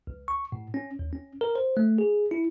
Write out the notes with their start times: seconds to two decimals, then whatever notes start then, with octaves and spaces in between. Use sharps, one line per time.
0.07 C#2
0.28 C#6
0.52 A2
0.74 C#4
0.99 D#2
1.13 C#4
1.41 A#4
1.55 C5
1.77 A3
1.98 G#4
2.31 E4